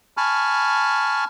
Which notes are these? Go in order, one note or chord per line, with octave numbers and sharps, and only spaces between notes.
G#5 A5 B5 C#6 F6